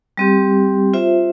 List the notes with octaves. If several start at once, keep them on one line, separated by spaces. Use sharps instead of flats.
G3 C4 G4
F4 C5 E5